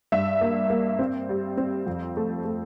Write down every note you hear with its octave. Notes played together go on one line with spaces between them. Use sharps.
G2 E5
A#3
A#3
C4
G3
C4
F2
A3
A3